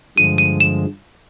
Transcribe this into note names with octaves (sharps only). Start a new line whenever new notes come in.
G2 D3 F3 G#3 D#7
D#7
E7